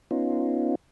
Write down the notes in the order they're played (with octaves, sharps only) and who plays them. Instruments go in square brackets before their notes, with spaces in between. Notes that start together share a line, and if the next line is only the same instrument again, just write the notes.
[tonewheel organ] B3 C#4 D#4 F4